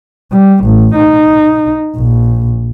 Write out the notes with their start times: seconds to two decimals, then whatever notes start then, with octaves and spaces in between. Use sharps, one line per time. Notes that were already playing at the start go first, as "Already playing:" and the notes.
0.32 G3
0.65 A1
0.95 D#4
1.96 A#1